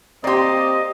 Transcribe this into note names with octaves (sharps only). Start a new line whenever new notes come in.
A#3 C4 G4 D5 D#5 C6